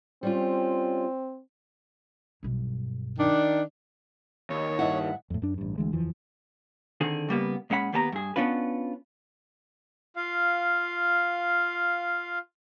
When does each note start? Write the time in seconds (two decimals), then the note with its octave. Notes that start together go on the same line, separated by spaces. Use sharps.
0.23 G3 C4 C#4 F4
2.43 B1 G2
3.18 D#3 D4
4.50 D#2 C#5
4.79 G2 E4 D#5 E5 F#5
5.30 F2 A2
5.42 F#2 D4
5.58 A1 G2
5.78 D2 E3 G#3
5.92 F#1 E2 E3 F3
7.01 D3 D#3 C4 G#4
7.29 C#3 G3 A#3 B3
7.70 A#2 G#3 C#4 F#5 B5
7.92 D#2 A#3 B3 G4 A5 A#5
8.12 G2 G#4
8.36 B3 C#4 D4 F4 B4
10.16 F4 F5